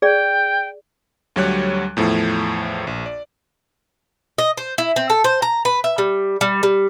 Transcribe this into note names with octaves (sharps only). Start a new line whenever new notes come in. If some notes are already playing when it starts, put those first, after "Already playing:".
G#4 D5 G5
D2 F#3 G3 C#5 F#6
E2 A2 F3 A3
A#1
D5
D#5
C5
E4
C4
A4
C5
A#5
B4
E5
G3
G3
G3